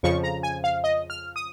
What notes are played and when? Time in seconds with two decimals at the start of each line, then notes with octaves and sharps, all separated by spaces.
0.03 F2 C#3 F3 C#6
0.24 A#5
0.43 G#5
0.64 F5
0.84 D#5
1.10 F6
1.36 D#6